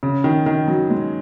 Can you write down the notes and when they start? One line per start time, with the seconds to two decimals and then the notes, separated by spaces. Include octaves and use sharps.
0.03 C#3
0.24 D#3
0.46 D#3
0.68 F#3
0.90 G#3